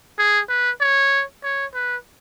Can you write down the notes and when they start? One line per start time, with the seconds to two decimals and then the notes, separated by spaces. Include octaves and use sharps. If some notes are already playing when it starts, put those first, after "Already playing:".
0.19 G#4
0.49 B4
0.80 C#5
1.44 C#5
1.74 B4